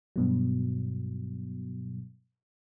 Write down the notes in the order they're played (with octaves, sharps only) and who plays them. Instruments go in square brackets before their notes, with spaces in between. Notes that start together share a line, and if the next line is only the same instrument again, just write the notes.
[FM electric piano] G2 B2 F#3